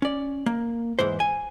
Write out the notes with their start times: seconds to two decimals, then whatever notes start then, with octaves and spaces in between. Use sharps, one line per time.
0.02 C#4 D5
0.46 A#3
0.99 E2 G#2 E3 C5
1.20 G#5